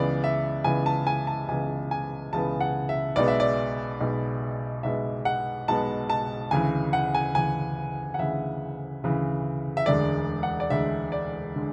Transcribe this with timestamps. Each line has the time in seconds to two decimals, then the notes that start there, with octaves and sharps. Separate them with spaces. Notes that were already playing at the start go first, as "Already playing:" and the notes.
Already playing: C#2 C#3 E3 B3 D5
0.24 E5
0.64 C#2 C#3 E3 B3 G#5
0.86 A5
1.07 G#5
1.27 A5
1.49 C#2 C#3 E3 B3 G#5
1.91 G#5
2.33 C#2 C#3 E3 B3 A5
2.60 F#5
2.89 E5
3.16 B1 B2 G#3 B3 D5
3.28 E5
3.40 D5
4.00 B1 B2 G#3 B3
4.83 B1 B2 G#3 B3 E5
5.25 F#5
5.68 B1 B2 G#3 B3 A5
6.10 A5
6.51 D2 C#3 E3 G#5
6.93 F#5
7.15 G#5
7.35 D2 C#3 E3 G#5
8.14 F#5
8.19 D2 C#3 E3 E5
9.03 D2 C#3 E3
9.77 E5
9.86 E1 D2 D3 G#3 D5
10.43 F#5
10.60 D5
10.70 E1 D2 D3 G#3 E5
11.12 D5
11.56 D3 G#3